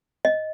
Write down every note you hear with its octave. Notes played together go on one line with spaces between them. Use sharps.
D#5